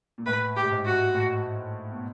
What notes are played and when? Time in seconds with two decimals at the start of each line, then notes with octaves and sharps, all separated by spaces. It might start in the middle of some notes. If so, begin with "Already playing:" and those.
0.18 A#2
0.26 A2 B4
0.56 G4
0.65 A2
0.71 G#2
0.85 F#4
1.15 A2
1.92 B2